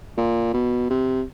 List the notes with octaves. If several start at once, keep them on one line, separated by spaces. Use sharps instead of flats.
A#2
B2
C3